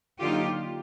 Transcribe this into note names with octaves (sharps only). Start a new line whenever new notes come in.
D3 F#3 A#3 D#4 F4 G4